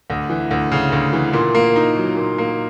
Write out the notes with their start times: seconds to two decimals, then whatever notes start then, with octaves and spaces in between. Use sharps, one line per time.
0.10 D2
0.30 E3
0.51 D2
0.72 C#3
0.92 D2
1.13 E3
1.33 A#2
1.55 A#3
1.76 D#4
1.96 F#3
2.17 A#2
2.38 A#3